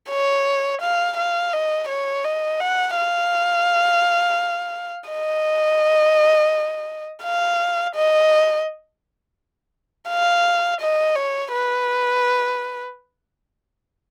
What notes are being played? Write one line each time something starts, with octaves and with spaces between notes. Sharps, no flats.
C#5
F5
F5
D#5
C#5
D#5
F#5
F5
D#5
F5
D#5
F5
D#5
C#5
B4